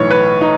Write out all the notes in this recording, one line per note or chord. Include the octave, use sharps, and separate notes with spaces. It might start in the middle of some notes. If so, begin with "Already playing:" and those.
Already playing: B1 A2 E3 C#5
B4
D#4